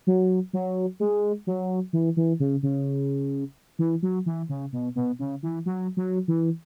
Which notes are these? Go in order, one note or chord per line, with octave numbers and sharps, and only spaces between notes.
F#3
F#3
G#3
F#3
E3
E3
C#3
C#3
E3
F#3
E3
C#3
B2
B2
C#3
E3
F#3
F#3
E3